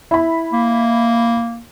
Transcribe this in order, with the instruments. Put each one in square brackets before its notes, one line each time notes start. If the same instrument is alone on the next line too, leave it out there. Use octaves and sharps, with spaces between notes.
[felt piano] E4 B5
[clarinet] A#3